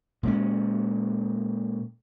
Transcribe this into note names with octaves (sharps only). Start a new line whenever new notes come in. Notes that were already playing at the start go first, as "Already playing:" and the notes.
A#2 G#3 B3 C#4